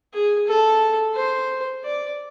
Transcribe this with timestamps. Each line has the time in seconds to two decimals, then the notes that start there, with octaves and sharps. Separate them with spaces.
0.13 G#4
0.47 A4
1.15 C5
1.84 D5